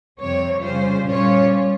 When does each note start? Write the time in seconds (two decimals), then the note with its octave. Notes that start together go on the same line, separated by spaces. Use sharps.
0.20 F2 C3 G3 C4 C#5
0.63 C#3 G3 C#4 F4 C5
1.07 A#2 G3 C#4 F4 C#5